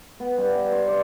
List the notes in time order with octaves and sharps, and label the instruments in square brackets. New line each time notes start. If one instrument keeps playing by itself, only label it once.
[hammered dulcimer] B3
G2
E5
C5
D5